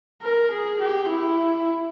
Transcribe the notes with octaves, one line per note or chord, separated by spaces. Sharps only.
A#4
G#4
G4
E4